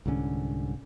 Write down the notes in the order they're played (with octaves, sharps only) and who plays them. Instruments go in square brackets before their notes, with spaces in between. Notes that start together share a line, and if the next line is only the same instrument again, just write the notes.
[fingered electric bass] C2 G#2 D3 C#4